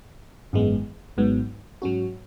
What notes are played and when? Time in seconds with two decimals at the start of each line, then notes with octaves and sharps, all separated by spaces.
0.53 G#1 F#2 E3 G#3 B3
1.17 G#1 G#2 F#3 B3
1.82 G#2 F#3 C#4 F#4